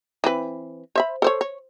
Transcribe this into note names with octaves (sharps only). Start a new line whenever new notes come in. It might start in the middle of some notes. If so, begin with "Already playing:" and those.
E3 C4 B4
C5 E5 B5
A4 C5 C#5
C#5